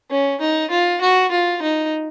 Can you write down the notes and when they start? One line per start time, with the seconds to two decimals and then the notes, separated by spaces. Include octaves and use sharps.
0.11 C#4
0.41 D#4
0.71 F4
1.01 F#4
1.31 F4
1.62 D#4